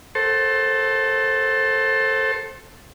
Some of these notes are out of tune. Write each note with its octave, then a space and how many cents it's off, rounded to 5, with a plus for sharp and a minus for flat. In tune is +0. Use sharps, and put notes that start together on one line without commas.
A4 +0 C5 +20 G5 -45